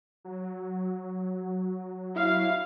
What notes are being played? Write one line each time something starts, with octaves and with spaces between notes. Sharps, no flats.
F#3
E4 F5